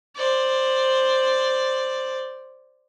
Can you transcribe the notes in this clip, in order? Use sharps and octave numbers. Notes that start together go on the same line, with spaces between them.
C5 D5